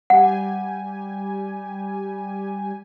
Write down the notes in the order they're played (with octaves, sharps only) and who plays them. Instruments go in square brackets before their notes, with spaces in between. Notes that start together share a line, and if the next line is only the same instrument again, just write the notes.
[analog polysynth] G3 G4 G#5 [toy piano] F#5